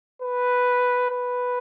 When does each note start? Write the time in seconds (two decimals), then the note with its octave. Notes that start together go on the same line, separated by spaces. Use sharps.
0.22 B4
1.10 B4